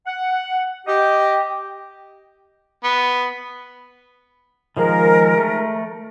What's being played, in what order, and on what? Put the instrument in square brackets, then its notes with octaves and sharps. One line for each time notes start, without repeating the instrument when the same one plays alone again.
[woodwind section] F#5
G4 D#5 G5
[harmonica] B3
[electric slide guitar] D#3 F3 G#3 [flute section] A#4
[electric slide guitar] A3